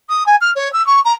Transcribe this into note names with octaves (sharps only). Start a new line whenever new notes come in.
D#6
G#5
F6
C#5
E6
C#6
A#5